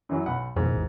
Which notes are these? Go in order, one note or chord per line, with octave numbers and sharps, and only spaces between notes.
F#2 E3 F#3
B1 F#5 B5
F2 G#2 B2 D#3
A1 E2